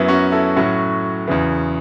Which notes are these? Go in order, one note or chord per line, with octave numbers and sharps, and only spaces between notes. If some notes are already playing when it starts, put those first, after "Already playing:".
Already playing: F#2 F#3 B3 E4
C#4 F#4
E4 A4
A2 F#3 C#4 F#4
E2 C#3 E3